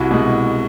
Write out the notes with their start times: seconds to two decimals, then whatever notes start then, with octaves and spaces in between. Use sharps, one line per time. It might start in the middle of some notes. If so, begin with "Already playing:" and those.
Already playing: C2 E4 F#4
0.11 B2 G#3